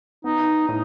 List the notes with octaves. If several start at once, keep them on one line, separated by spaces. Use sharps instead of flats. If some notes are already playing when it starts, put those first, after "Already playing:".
B3 D#4
A2 D#4